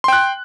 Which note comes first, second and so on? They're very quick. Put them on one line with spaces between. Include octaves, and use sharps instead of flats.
C6 G5 F#6